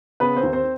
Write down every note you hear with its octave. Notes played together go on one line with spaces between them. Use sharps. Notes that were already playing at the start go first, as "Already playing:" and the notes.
C#3 B3 B4
C4 C5
D#2
C4 C5